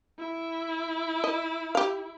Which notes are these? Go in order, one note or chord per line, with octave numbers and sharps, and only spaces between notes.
E4
D#5
G4 F5